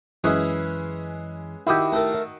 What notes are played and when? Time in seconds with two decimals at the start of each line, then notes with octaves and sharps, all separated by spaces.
0.24 F#2 E3 G#3 C#4 G#4 B4 E5
1.67 D#3 E4 F#4 G4 D#6
1.92 A3 A4 A#4